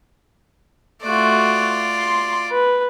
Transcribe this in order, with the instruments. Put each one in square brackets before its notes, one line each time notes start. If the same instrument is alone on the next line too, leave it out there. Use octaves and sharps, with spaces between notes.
[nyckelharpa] A3 F#4 [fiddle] F4 D5
[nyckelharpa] C6
B4